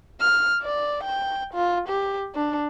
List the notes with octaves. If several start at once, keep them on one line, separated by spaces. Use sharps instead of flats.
F6
D5
G5
F4
G4
D4